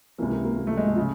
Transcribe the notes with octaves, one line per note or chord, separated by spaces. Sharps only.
C#2 C3 E3 A#3
A#3
A#3
A#3
A3
G#3
A3
C#3 F3